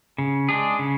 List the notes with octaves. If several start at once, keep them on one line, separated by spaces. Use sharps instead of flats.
C#3
G#3 D4 G#4
C#3